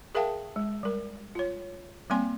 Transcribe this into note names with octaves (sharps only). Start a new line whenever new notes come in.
G#4 A#4 E5 F5 G5 A5
G#3
G3 A#4
F4 C#5
G3 A#3 C4 G#5 C6